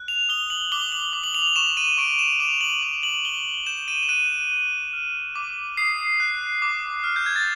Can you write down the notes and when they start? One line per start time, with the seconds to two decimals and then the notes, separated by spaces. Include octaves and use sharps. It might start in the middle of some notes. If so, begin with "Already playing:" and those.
Already playing: F#6
0.08 F7
0.29 D#6 G7
0.50 F#7
0.72 D6 G7
0.92 F#7
1.13 D6
1.24 F#7
1.35 F7
1.47 F7
1.56 C#6 E7
1.77 D#7
1.97 C#6 D7
2.19 E7
2.40 D6 F7
2.61 F#7
2.82 D6 F#7
3.03 F#7
3.24 C#6 G7
3.66 G6 E7
3.88 D#7
4.03 E7
4.09 F#6 D#7
4.51 F#6
4.93 F6
5.36 D6
5.77 D#6 C7
6.20 F#6
6.62 D6
7.04 F6
7.16 G6
7.26 G#6
7.36 A6